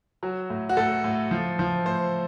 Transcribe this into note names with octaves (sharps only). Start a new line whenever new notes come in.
F#3 F#4
A2
F#4
A2 A4
A2
F3
F3
A2 C5